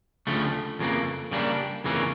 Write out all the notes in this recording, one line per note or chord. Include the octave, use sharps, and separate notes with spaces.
D2 C#3 F3 A3
F2 C#3 E3 A#3
C#3 G3 A#3 D4
F2 C#3 E3 A#3 C#4